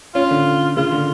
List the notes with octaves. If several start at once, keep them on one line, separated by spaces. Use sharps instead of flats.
C#4 F4
D3
C#3 F4
D3